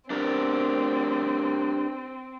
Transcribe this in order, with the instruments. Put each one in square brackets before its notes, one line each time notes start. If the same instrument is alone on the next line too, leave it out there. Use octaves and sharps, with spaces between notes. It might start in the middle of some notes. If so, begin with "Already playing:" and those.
[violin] C4 [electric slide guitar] D4 G4 A#4